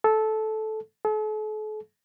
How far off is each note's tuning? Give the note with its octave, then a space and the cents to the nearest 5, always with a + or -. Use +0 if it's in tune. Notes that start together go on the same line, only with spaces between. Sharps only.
A4 -15
A4 -45